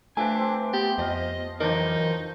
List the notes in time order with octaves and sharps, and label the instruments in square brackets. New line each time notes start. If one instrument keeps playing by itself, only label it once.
[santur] F3 E5 [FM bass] A3 [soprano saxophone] D4 [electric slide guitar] B4 G5 G#5
[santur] C4 C6 D6
[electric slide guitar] B3 [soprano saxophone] G4
[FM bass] F2 [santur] F3 F5 [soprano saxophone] D#5
[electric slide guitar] E3 F#3 A#4 [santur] D4 C5 [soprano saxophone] D#4